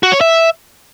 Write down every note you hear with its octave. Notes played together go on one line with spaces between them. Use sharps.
F#4
C#5
E5